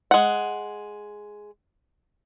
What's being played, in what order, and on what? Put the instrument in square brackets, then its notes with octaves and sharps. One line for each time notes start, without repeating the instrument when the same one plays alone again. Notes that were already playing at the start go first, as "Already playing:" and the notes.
[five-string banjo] G#3 F#5